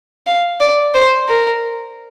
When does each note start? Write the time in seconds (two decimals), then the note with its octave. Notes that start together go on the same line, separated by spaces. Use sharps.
0.26 F5
0.60 D5
0.94 C5
1.28 A#4